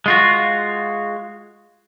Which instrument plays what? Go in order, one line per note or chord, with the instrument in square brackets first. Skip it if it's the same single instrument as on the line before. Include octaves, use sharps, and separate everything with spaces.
[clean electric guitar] G#3 F4 F#4